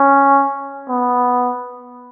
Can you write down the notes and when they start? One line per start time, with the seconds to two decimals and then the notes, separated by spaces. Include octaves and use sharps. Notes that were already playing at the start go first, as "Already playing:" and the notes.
Already playing: C#4
0.89 B3